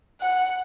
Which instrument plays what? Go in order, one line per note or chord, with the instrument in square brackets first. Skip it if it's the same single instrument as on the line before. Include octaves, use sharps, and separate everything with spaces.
[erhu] F#5